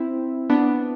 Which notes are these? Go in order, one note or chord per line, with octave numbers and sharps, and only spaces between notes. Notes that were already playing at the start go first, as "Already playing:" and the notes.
Already playing: C4 E4
B3 D4